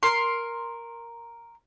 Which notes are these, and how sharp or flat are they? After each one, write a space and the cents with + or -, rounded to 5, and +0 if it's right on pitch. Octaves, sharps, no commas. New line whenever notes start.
A#4 +0 C6 +10